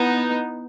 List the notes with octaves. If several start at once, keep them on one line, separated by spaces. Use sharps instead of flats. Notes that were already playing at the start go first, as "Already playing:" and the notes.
Already playing: B3 D#4 E4 B4 F#5 B5